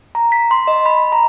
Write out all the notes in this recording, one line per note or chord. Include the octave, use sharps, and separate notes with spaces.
A#5
B6
C6
D#5
B5
A#5